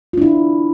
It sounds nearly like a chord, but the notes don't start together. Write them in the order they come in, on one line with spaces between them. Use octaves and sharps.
F4 D4 E4